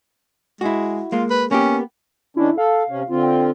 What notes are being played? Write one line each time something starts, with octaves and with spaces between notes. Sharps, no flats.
G#3 E4 F#4
G#3 A#3 F4
B4
A#3 B3 C#4 G4
D#3 C#4 D4 E4
A4 F5
C3 C#4
D3 C4 F4
G5